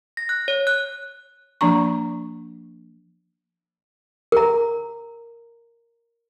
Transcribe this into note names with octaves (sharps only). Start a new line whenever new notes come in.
A#6
F#6
C#5
F#6
F3 A#3 D4 A#5 C#6
A#4 A#5